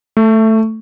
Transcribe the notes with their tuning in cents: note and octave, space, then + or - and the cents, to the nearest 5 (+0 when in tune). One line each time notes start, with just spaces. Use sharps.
A3 +5